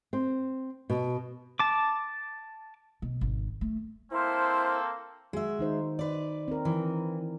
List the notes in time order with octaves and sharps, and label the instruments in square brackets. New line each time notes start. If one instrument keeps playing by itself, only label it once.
[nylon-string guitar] C4
B2
[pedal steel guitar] A5 D6
[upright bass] B2
G#1
A3
[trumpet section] A#3 C4 A4 [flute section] E4 C5 F6
[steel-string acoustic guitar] G#3 E5 [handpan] F#4
[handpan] D#3 D#4 C5
[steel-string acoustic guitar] B4 D5
[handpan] C4 A#4
[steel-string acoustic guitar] E3